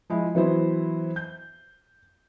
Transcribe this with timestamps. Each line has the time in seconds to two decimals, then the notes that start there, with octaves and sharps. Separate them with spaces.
0.10 F3 G#3 E4
0.35 E3 F#3 B3 E4 C5
1.16 G6